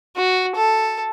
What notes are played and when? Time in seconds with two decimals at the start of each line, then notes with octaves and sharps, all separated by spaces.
0.17 F#4
0.55 A4